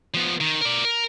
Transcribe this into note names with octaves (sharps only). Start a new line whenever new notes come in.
F3 B3
D#3
A#4 D5
A#4